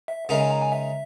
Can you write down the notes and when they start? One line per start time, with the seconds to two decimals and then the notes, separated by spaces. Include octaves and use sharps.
0.08 E5
0.29 C#3 G#3 D#4 A#4 E5
0.40 G#5
0.50 A#5
0.61 G#5
0.72 E5